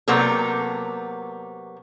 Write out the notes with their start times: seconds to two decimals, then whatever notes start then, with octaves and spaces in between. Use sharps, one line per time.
0.08 C3 F#3 A#3 B3 A4